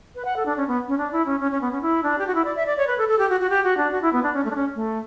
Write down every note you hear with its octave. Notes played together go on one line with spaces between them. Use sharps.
B4
F#5
A4
D4
C#4
B3
C#4
D4
E4
C#4
C#4
C#4
B3
C#4
E4
D4
G4
F#4
E4
D5
E5
D5
C#5
B4
A4
A4
G4
F#4
F#4
G4
F#4
D4
F#4
E4
B3
D4
C#4
A3
D4
C#4
A3